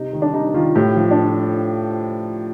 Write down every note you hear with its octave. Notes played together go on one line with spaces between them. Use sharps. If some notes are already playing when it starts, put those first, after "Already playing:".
Already playing: C3 D#4
D#3
D4
C3 D#4
D#3 F4
A2 G4
F3
D4